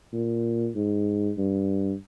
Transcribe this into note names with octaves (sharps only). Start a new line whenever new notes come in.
A#2
G#2
G2